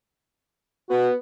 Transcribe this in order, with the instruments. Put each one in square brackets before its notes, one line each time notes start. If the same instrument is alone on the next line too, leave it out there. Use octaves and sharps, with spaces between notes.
[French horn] B3 [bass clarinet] F#4